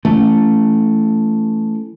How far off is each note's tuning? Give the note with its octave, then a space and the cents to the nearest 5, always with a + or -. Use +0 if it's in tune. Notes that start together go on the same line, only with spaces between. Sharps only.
E3 +20 A3 +0 C#4 +0